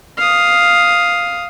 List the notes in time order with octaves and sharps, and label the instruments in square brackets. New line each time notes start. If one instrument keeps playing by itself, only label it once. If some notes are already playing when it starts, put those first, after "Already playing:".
[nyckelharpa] F5 D#6